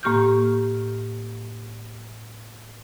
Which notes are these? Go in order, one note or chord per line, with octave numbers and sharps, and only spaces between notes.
A2 A#3 G4 C#6 F6 G6